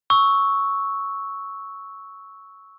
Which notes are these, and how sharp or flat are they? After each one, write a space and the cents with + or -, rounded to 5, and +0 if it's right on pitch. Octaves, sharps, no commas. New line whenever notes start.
C#6 +0 E6 -15